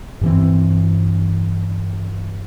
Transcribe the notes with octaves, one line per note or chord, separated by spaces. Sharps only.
G2 E3 C4